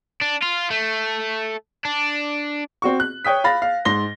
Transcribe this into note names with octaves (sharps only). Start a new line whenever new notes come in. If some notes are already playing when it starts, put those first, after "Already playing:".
D4
F4
A3
D4
C4 F#4 C#6
F#6
C#5 G5 D#6 B6
F5 B5 A6 A#6
F5
G#2 C6 A#6 G7